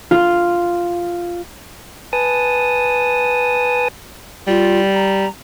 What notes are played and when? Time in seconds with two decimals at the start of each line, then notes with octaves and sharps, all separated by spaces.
0.11 F4
2.13 B4 G#5 A5 D#6
4.47 G3 F4
4.94 A#5